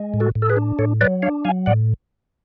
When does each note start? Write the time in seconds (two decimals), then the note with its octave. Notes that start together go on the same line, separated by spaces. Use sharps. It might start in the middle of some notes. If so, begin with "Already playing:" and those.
Already playing: G#3
0.14 A2
0.20 F#4 A4
0.35 A2
0.42 A4
0.50 G#4 B4
0.57 D4
0.79 A2 A4 C#5
1.01 F#3 B4 D5
1.22 D4 C#5 F5
1.45 F#3 F5 G#5
1.66 A2 D5 F#5